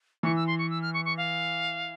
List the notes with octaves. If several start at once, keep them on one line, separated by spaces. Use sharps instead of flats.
E3 C#6
E6
C6
C#6
E6
F6
C#6
C#6
F5